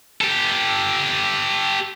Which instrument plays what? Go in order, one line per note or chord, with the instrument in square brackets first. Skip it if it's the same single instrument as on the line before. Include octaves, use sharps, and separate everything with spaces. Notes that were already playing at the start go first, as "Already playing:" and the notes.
[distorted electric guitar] G4 A4